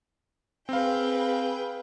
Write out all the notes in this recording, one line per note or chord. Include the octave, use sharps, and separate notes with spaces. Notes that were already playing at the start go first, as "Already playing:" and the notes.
C4 G#4 B4 F5 G5